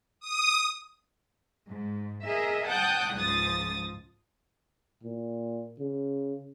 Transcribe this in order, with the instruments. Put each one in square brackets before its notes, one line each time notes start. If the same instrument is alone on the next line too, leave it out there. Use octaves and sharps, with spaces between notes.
[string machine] D#6
[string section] G#2
G#4 A#4 D#5 E5
F#5 G5 A5 D#6 F#6 G6
C#2 G#2 F3 D#6 A6
[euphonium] A#2
C#3